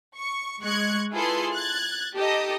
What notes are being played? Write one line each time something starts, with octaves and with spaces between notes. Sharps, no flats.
C#6
G#3 C#6 F#6 G#6
E4 F4 G#4 A4 B4 C6
F#6 G#6 A6
D#4 G4 A4 D#5